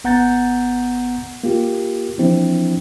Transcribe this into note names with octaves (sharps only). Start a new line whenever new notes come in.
G#1 B3 F#5 A#5 G6 A6
A#3 F4 G4
E3 F3 A#3 C4 D4 E4